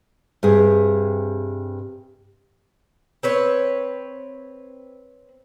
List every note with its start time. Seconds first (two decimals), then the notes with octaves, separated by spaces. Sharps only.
0.43 G2 C3 G#4
3.23 C4 B4 C#5